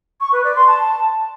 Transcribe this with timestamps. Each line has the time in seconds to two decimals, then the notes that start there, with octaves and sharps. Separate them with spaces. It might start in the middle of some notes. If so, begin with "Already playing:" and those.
0.21 C#6
0.32 B4
0.44 D5
0.56 C6
0.67 A5